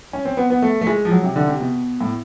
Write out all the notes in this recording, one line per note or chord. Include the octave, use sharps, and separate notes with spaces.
C#4
C4
B3
B3
A3
A3
G#3
F3
F#3
C3
D3
C3
B2
A2